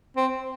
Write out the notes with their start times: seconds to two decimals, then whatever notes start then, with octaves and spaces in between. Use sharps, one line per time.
0.17 C4